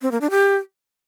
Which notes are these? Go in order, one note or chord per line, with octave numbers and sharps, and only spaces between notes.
C4
A#3
D4
G4